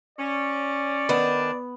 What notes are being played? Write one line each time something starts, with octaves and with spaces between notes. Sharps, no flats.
C#4 D5
D#3 B3 D4